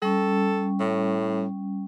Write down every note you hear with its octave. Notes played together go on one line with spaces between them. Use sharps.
G3 C#4 A4
A2